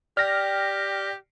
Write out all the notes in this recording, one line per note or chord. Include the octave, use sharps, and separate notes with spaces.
G4 D5 G5 F6 A#6